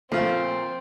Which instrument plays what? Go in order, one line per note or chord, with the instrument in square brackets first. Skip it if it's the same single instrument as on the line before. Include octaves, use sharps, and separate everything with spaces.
[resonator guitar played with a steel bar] A#2 F3 [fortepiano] A3 F4 [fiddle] C4